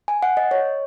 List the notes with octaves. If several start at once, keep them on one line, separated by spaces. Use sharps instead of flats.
G#5
F#5
D#5
C#5